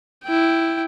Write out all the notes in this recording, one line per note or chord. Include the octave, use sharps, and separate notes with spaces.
E4 G5